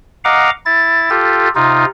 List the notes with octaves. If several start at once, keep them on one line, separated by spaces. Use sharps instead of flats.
D#5 F5 F#5 A#5 D6
E4 A6
F4 G4 A4
C3 D#4 F4